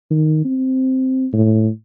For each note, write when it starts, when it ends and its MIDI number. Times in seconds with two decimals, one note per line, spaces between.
0.11 0.43 51
0.45 1.27 60
1.33 1.69 45